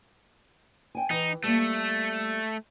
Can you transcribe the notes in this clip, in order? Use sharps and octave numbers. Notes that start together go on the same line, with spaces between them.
G5 G#5
E3 D#4
G3 A3 A#3